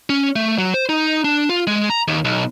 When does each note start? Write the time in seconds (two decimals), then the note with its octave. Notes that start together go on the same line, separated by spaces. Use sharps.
0.10 C#4
0.36 A3
0.58 F#3
0.74 C5
0.89 D#4
1.24 D4
1.50 F4
1.67 G#3
1.90 A#5
2.08 D#2
2.25 B1